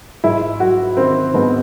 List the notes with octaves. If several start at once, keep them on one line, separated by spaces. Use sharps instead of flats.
G#2 E4
F#3 F#4
D#3 C4
G#2 B3